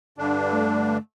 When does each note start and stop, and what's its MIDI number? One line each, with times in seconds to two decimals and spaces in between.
0.18 0.98 43
0.18 0.98 50
0.18 0.98 62
0.51 0.97 57